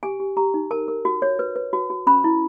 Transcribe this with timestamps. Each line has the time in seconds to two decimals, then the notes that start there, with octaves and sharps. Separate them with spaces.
0.03 G4 G#5
0.20 G4
0.37 G4 A#5
0.54 D#4
0.71 A#4 A5
0.88 A#4
1.05 F#4
1.22 C#5
1.39 B4
1.56 B4
1.73 F#4
1.90 F#4
2.07 C#4 B5
2.24 E4